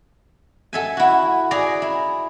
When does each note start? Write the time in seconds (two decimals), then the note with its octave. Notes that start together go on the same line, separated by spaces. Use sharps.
0.73 A4 E5 G#5
0.97 E4 F#4
1.51 G#4 D5 A#5
1.82 E4